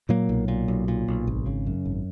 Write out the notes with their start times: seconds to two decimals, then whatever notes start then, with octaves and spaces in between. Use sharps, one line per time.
0.09 A#2 F#3 A#3
0.29 B1
0.48 A#2
0.68 B1
0.88 A#2
1.08 B1
1.27 G#1
1.46 C#3
1.67 F#2
1.85 G#1